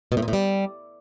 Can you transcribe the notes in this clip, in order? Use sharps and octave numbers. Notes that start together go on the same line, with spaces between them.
B2
A2
A#2
A2
G3